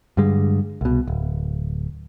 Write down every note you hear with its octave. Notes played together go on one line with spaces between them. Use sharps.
G2 D3 G3 G#3
C2 B2
D1